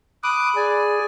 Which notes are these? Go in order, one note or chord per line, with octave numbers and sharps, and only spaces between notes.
B5 D6 D#6 F#6
G#4 D5 G#5